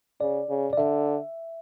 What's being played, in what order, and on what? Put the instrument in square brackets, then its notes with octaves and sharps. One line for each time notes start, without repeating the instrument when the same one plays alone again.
[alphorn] C#3 [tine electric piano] D5
[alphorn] C#3
[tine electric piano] D5
[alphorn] D3 [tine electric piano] E5